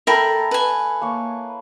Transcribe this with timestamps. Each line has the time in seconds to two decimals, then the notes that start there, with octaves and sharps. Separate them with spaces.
0.07 E4 A4 A#4 G5 B5
0.51 B4 G#5
1.02 A#3 C#5